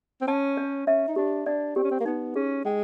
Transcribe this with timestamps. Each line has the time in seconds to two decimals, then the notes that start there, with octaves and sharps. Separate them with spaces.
0.21 C4
0.28 C#4 A5
0.57 C#5
0.87 C#4 E5
1.08 D#4
1.16 D4 G4
1.46 D4 D5
1.76 C4 G4
1.83 C#4
1.91 C4
2.01 A#3
2.05 B3 D#4
2.35 C#4 G#4
2.65 G#3 G5